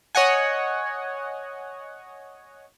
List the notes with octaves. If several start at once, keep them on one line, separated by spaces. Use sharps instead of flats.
C#5 D#5 F#5 G#5